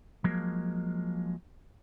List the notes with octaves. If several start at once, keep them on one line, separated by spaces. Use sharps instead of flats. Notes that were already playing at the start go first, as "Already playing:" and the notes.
F3 F#3 G#3 A#3